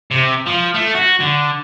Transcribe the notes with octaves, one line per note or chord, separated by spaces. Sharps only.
C3
F3
A3
F#4
D3